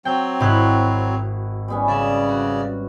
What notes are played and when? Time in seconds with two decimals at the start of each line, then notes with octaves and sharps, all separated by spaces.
0.05 F#3 C4 G5
0.40 G#1 E4 F#4 G4 F#6
1.68 G3 B3 C#4
1.88 C#3 D5 E5
2.29 F#4